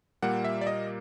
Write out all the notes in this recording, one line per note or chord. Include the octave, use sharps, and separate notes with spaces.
A#2 G3 A#3 F#5
E5
D5
D#5